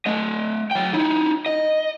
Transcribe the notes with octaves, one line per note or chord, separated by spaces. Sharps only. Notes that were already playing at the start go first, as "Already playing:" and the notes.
A3 D#5
F#3 G5
D#4 E4
D#5